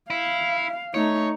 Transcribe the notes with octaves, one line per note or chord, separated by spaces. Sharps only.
E4 F5
A3 D#4 C#5